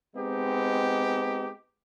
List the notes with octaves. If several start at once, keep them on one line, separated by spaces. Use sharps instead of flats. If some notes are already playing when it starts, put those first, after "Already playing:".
G#3 B3 C4 D#4 G4